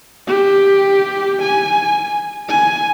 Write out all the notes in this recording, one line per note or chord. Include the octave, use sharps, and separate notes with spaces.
G4
G#5
G#5